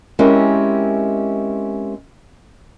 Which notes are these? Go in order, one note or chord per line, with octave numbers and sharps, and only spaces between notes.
G#3 C4 C#4 E4 G4 A#4